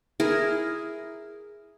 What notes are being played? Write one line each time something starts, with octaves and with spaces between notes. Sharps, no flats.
E4 G#4 A#4